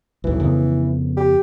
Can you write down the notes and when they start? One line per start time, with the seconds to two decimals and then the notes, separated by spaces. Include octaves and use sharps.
0.24 D#1 B1 E3
0.40 F2 C#3 B3
1.16 G4